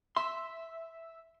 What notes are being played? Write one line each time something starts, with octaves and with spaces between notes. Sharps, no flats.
E5 C6